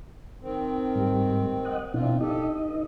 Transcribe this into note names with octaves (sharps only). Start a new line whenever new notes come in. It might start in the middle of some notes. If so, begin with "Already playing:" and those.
D#3 C4
G#2 G3
D#5 F#5
B2 F3 C4 D4 E4 F4
D#4 G4 A4 D#5
G2